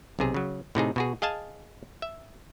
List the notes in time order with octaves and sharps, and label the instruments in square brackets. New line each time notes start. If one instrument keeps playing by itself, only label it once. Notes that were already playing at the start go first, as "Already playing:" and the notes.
[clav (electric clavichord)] B1 C3 G#4
C#3 F#3
A2 C3 D#4 G#4
B2 F#4 G#4
G#4 D#5 F5 G#5 A5
E5